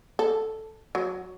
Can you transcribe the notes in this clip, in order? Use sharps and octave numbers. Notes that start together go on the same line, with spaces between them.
A4
F#3